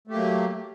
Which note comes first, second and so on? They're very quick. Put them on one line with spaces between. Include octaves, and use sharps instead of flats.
A3 G4 A#3 F#3